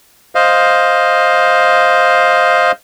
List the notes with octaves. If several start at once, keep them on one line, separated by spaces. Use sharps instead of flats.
C5 D#5 F5